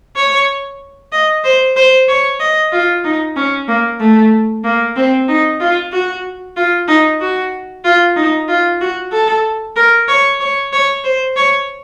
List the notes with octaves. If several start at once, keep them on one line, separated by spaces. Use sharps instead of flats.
C#5
D#5
C5
C5
C#5
D#5
F4
D#4
C#4
A#3
A3
A#3
C4
D#4
F4
F#4
F4
D#4
F#4
F4
D#4
F4
F#4
A4
A#4
C#5
C#5
C#5
C5
C#5